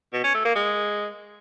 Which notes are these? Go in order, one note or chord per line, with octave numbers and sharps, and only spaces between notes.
B2
C#4
A3
A#3
G#3